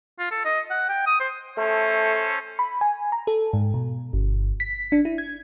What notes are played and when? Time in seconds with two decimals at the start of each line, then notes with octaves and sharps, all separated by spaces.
0.19 F4
0.31 A4
0.45 D#5
0.71 F#5
0.89 G5
1.07 D#6
1.20 C5
1.57 A3 C#4 A4 C5
2.59 B5
2.81 G#5
3.12 A#5
3.27 A4
3.53 G#2
3.74 B2
4.13 G1
4.60 B6
4.92 D4
5.05 E4
5.18 G#6